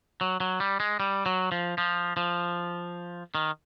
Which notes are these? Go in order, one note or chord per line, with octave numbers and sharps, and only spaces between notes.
F#3
F#3
G3
G#3
G3
F#3
F3
F3
F3
D#3